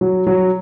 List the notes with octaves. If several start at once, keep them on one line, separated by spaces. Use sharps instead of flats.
F#3
F#3